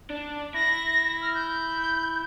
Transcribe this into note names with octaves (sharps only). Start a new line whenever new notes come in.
D4
E4 A#6
F6
G6